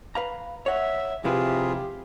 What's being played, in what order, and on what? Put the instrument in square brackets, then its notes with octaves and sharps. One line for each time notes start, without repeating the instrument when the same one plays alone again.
[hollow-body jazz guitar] B4 F5 A#5
[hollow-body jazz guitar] C#5 F#5 [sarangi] E5
[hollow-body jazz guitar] F2 E4 B4 [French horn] C3 [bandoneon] F4 G#4 [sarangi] G4